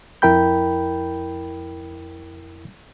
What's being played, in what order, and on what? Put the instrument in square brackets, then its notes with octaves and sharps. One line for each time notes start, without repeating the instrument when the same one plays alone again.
[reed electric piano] F2 E4 A#4 G5 B5 G6